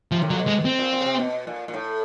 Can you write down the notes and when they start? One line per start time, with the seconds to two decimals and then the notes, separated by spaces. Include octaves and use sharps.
0.12 C3 F3
0.22 A2
0.30 A#2 F#3
0.39 B2
0.47 G#3
0.65 C4
0.79 A#2
0.93 A#2
1.01 C#3
1.06 C3
1.19 B2
1.47 A#2
1.68 A#2
1.74 A2